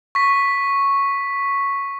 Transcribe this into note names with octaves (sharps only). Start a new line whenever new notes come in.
C#6 B6